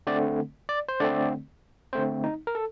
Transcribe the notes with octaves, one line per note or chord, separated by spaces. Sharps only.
D3 A3 C4 D5
D5
C5
D3 A3 C4 D5
D3 A3 C4 C5
D#4
A#4
A4